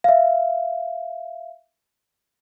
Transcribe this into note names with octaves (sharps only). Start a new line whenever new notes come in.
E5 F5